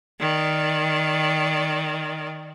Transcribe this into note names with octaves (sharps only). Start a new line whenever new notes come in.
D#3 D5